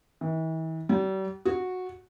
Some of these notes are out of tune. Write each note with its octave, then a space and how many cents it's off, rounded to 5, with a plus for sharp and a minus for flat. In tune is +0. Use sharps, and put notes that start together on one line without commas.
E3 -40
G3 -40
F#4 -10